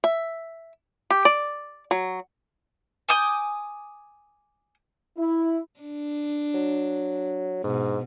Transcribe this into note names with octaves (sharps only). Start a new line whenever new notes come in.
E5
G4
D5
F#3
G#5 D6 D#6 G6
E4
D4
F#3
G#2 B2